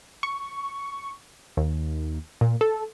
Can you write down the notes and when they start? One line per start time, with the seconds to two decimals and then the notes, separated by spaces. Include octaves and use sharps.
0.23 C#6
1.57 D#2
2.41 A#2
2.61 A4